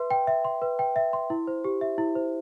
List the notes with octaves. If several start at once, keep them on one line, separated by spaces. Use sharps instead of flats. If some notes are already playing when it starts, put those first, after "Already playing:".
Already playing: B4 E5 C6
G5
E5
C6
B4
G5
E5
C6
E4
C5
G4
E5
E4
C5